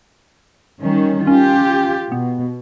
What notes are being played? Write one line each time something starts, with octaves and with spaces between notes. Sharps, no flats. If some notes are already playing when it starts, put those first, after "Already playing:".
D#3 G3 C#4
C#4 F4 G4
B2 B3